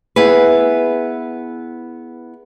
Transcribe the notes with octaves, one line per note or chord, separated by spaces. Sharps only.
B3 E4 G#4 B4